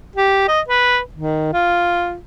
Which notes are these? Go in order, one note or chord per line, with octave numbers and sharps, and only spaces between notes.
G4
D#5
B4
D#3
F4